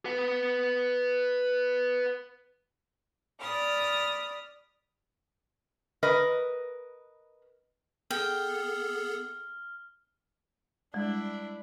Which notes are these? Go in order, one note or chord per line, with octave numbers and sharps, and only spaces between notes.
B4 F#5
D5 B5 D#6 F6
A#4 B4 D#5
B3 G#4 A4 G5 F6
G3 G#3 D4 E4